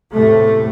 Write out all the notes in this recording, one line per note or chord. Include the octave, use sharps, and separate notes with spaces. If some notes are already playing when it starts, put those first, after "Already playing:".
E2 A2 C3 A3